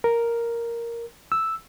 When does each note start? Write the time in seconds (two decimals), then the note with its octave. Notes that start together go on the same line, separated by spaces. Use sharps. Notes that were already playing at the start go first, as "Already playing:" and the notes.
0.04 A#4
1.32 E6